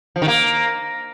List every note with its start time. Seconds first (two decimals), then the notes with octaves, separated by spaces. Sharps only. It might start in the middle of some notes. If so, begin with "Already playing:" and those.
0.16 F3
0.22 D#3
0.28 A#3